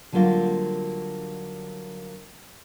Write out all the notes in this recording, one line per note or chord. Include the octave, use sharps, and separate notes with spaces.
D3 F#3 G3 A#3 F4